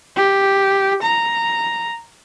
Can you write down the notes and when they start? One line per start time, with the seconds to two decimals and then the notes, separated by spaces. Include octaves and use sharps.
0.16 G4
1.02 A#5